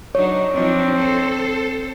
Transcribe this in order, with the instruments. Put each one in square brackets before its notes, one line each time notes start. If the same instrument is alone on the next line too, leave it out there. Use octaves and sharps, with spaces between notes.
[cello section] F#3 D4 D#4 [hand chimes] C#5
[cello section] F3 D4 D#4 [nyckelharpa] C4
[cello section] A4 C5